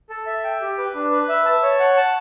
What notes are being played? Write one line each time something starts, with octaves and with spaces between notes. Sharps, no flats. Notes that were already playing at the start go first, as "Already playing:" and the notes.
A4
E5
G5
G4
B4
D4
B4
E5
A5
C#5
F#5
A5